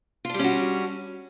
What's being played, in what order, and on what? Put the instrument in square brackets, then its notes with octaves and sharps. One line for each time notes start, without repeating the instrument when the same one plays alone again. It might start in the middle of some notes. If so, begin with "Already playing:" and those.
[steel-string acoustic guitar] F4
D4
G3
C#4
F#4